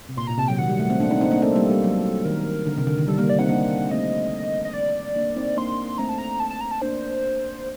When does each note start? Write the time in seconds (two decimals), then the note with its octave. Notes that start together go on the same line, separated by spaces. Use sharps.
0.09 C3
0.17 A#2 C6
0.27 A#2 A#5
0.38 C3 A5
0.48 F#3 G5
0.58 D#3 F#5
0.69 G3
0.80 A3
0.90 A3 C4
1.00 A#3 D4
1.11 C4 D#4
1.21 C4 D#4
1.31 A#3 D4
1.42 A3 C4 A4
1.55 G3 A#3
1.69 G3
1.84 F#3
2.25 D#3 A#4
2.66 D3
2.78 C3
2.87 D3
2.98 D#3
3.08 G3 A4
3.18 G3 A#3 A#4
3.29 D5
3.39 C4 D#4 F#5
3.49 A#3 D4
3.91 A3 C4 D#5
4.65 D#5
4.74 D5
5.16 A#3 D4
5.36 C4 D#4
5.57 A#3 D4 C6
5.98 A3 C4 A#5
6.09 A5
6.18 A#5
6.40 A5
6.50 A5
6.61 A#5
6.71 A5
6.82 A#3 D4 C5